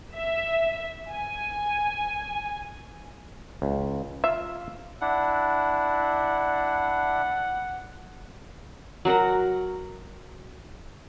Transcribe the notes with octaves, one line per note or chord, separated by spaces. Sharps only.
E5
G#5
C#2
F4 E5 F5
D4 E4 F#5
F#3 F#4 A#4 F#5